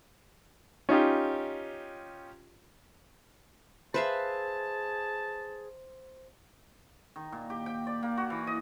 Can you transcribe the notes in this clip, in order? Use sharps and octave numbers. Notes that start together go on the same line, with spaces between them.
C#4 D#4 F4 G4
G#4 B4 C5 E5 F5 A5
D#3
A#2
G4
G5
D5
A#3
F#4
E3
D#5